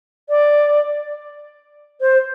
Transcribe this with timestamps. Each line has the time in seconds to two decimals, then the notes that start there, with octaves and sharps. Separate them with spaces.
0.29 D5
2.01 C5